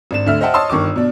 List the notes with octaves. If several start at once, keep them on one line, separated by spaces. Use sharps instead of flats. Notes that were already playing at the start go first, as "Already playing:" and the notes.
G#1 D4 E7
D2 D3 E5 F6
C5 D#5 E5 F#5 G5 A5
C#5 D#5 A5 C6 D#6 E6
G1 D#3 C#6 D6
B2 D4